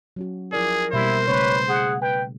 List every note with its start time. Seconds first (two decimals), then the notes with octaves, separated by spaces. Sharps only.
0.16 F#3 C#4 F#4
0.53 F3 E4 G#4 A#4 D5
0.93 B2 G3 A#3 E4 C5
1.27 C#3 A3 C#4 B4 C#5
1.69 G#4 F#5
2.02 B4 G5